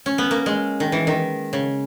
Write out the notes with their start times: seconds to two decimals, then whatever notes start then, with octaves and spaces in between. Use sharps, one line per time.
0.06 C#4
0.18 B3
0.31 A#3
0.46 G#3
0.80 D#3
0.92 E3
1.07 D#3
1.53 C#3